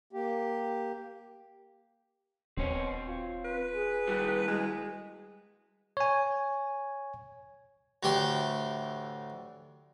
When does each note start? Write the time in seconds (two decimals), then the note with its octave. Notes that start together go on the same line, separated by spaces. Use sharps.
0.13 A#3 G4
2.57 D#1 B2 C4 C#5
3.07 F4
3.45 B4
3.75 G#4
4.07 G3 E4 F#4
4.48 G#3
5.97 C#5 G#5
8.03 D2 A2 E3 G4 G5 C6